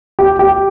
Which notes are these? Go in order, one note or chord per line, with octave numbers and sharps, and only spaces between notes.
G4
G4